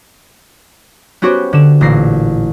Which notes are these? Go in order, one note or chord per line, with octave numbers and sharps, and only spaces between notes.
B3 C#4 F#4 G4 C5 C#5
D3 E7
A1 A#2 A#6 C7